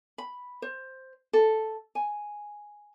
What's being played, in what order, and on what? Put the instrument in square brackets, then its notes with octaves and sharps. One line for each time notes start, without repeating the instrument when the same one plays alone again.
[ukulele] B5
C5
A4
G#5